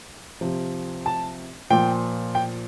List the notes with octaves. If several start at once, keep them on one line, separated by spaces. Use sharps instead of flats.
C3 F3
A5
A#2 F3 G5
G5